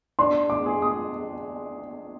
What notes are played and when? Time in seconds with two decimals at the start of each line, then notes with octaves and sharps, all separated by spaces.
0.19 D4 C6
0.50 D6
0.66 G#4
0.82 D#6